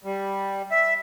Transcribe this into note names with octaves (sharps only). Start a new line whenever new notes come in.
G3
E5